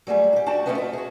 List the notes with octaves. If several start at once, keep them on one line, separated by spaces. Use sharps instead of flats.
F#3 G3 A3 G#4
F#4 G4
D4 F#4 G5 A5
A3 C#4 F4 F#4 B4 D#5
E5
F#4 G#4